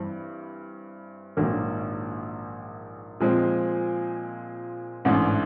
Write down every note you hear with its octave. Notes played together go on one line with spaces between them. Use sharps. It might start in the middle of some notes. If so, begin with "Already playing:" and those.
Already playing: G2 E3 G3 C4
A#1 G#2 D#3 F#3 A#3
A#2 F3 G#3 C4
A1 G#2 E3 A3 D4